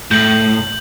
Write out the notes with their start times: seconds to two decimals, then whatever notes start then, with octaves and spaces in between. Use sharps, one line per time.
0.11 A2 G6 F#7